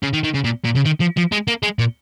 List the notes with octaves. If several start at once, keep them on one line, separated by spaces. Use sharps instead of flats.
C#3
D#3
D#3
C#3
A#2
A#2
C#3
D#3
F3
F3
G#3
A#3
G#3
A#2